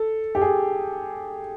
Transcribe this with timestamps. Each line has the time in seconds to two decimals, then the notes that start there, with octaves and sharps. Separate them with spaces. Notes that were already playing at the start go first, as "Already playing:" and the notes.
Already playing: A4
0.35 G4
0.41 G#4